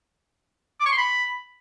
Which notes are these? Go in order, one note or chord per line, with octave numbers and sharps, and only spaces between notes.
D6
C#6
C6
B5